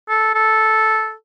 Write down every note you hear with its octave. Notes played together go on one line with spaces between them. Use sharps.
A4
A4